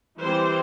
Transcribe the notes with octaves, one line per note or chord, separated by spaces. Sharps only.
E3 G3 C4 C5